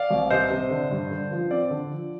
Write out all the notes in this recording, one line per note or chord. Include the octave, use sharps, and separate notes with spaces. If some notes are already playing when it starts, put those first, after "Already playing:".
Already playing: D5 F5
C2
C3 C5 D#5
C3
D3
G2
D3
F3
C4 D5
D3
F3